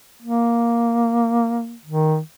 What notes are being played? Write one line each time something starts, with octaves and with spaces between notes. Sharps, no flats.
A#3
D#3